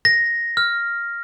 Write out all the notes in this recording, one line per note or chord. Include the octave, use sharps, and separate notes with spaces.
A#6
F6